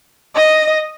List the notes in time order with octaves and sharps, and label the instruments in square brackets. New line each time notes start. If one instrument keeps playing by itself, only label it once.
[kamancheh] D#5